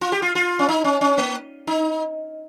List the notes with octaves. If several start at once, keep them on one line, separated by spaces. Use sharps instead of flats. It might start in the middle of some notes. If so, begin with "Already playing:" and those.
F4
G4
F4
F4
C#4
D#4
C#4
C#4
A#3
D#4